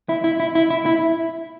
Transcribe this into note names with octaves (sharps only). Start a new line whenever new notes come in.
E4
E4
E4
E4
E4
E4